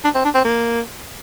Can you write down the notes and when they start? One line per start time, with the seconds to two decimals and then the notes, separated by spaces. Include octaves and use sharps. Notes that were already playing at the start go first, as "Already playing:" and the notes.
0.04 D4
0.15 C4
0.24 D4
0.35 C4
0.44 A#3